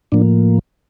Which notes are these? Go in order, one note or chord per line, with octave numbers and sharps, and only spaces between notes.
A2 F3 A#3 D4